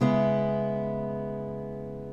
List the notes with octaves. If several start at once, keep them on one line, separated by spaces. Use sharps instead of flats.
C#3 G#3 B3 E4